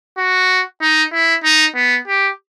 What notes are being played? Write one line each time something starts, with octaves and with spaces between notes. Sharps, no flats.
F#4
D#4
E4
D#4
B3
G4